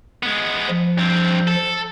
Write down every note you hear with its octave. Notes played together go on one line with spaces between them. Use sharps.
G#3 B3
F3
G2 C4
A4